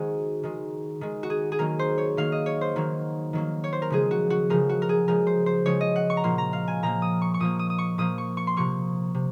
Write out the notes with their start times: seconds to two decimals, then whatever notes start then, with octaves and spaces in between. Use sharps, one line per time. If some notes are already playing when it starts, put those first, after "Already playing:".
Already playing: D#3 G#3 F#4 G#4 C5
0.43 D#3 G#3
1.01 D#3 G#3
1.23 F#4
1.30 G#4
1.52 G#4
1.59 D#3 F#3 A#3 A#4
1.79 C5
1.98 C#5
2.17 D#3 F#3 A#3 F5
2.32 D#5
2.46 C#5
2.61 C5
2.76 D#3 F#3 A#3
3.33 D#3 F#3 A#3
3.64 C#5
3.73 C5
3.82 A#4
3.90 C#3 F3 G#3 G#4
4.11 F#4
4.30 F#4
4.50 C#3 F3 G#3 A#4
4.69 F#4
4.82 A#4
4.89 G#4
5.08 C#3 F3 G#3 A#4
5.27 C5
5.46 C5
5.65 C#3 F3 G#3 C#5
5.81 D#5
5.96 F#5
6.10 C#6
6.17 A#5
6.24 A#2 F3 A#3 C6
6.38 A#5
6.53 F5
6.68 G#5
6.83 A#2 F3 A#3 A#5
7.02 D#6
7.22 C#6
7.34 C#6
7.40 A#2 F3 A#3 D#6
7.59 D#6
7.70 D#6
7.78 C#6
7.98 A#2 F3 A#3 D#6
8.18 C#6
8.37 C#6
8.47 C6
8.56 C3 F3 A#3 C#6
9.15 C3